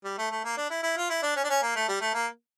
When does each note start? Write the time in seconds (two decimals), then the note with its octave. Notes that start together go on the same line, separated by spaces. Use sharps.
0.04 G3
0.18 A3
0.31 A3
0.44 A#3
0.58 D4
0.70 E4
0.83 E4
0.97 F4
1.10 E4
1.22 D4
1.36 C#4
1.44 D4
1.49 C#4
1.62 A#3
1.76 A3
1.88 G3
2.01 A3
2.14 A#3